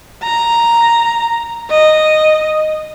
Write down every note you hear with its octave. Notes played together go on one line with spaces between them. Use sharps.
A#5
D#5